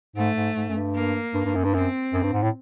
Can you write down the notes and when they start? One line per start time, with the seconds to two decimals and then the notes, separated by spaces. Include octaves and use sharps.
0.16 G#2 A3
0.36 G#2
0.56 G#2
0.69 F#2
0.76 G2
0.95 A#3
1.34 G2
1.45 G2
1.55 F#2
1.65 G2
1.74 F#2 C4
2.13 F#2
2.23 G2
2.33 G#2
2.42 A2